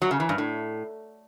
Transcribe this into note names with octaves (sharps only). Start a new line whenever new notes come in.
F#3
C#3
E3
G2
A2